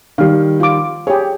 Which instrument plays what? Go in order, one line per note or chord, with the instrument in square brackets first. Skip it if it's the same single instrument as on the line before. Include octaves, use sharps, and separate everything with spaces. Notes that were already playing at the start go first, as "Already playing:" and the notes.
[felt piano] D#3 G3 [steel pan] F5
[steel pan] F4 D6
[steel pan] G4 G#4 [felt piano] C#5